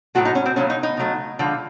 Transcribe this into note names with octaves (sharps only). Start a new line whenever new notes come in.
A2 F#3 A3 F#4
D#4
C#4
C4
C#3 F#3 A3 C#4
D#4
D#4
C#3 F#3 A3
D3 F3 G#3